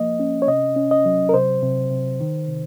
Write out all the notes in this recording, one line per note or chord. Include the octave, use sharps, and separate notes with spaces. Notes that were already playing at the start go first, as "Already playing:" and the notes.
Already playing: F3 A#3 D#5
C#4
C#5
C3 D#5
C#4
D#5
F#3
A#4
C3 C5
C3
C3
D#3
C3